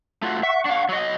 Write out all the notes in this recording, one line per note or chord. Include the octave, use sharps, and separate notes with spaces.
A3 F4 F#4
E5 F#5 C#6
D4 F5
F#3 D#5